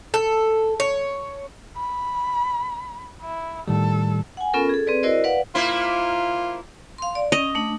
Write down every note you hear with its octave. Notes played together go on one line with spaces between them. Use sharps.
A4
C#5
B5
E4
A2 D#3 G3 A4
F#5 G#5
B3 C#4 F4 A4 A#4
G#4 A4
C4 G#4 B4 D5
E4 F#4 A#4 C5 D5 D#5
B4 D5 F5 F#5
A#3 E4 F4 C5
F5 C6
D5
C#4 D#5
A3 D4